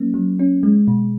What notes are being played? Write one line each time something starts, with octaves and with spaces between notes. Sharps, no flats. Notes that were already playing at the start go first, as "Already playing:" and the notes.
Already playing: F#3 A#3 C#4
F#3
C#4
G#3
B2